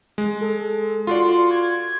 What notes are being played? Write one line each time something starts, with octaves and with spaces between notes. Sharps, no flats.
G#3
A4
F4 F#4 D5 C6
G#6